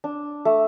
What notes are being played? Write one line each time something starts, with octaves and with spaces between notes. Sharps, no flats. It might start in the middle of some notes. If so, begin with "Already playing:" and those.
D4
A3